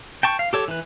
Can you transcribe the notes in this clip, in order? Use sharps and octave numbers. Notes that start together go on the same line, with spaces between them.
G5 A5 C#6
F5
G4 A4 C#5
E3 B4